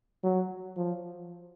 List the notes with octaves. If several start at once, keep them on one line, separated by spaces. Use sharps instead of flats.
F#3
F3